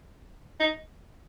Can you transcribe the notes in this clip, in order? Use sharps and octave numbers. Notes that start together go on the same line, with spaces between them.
D#4